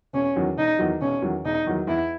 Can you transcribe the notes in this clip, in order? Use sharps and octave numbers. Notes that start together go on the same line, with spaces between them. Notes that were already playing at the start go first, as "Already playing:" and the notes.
E1 C#4
E2 D#3 F#3
E1 D#4
E2 D#3 F#3
E1 C#4
E2 D#3 F#3
E1 D#4
E2 D#3 F#3
E2 E4